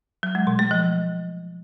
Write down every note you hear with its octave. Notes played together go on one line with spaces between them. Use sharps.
F#3
G#3
B2
A3
F3